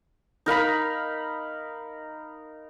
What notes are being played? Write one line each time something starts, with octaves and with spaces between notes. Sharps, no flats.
D#4 A#4 F5 B5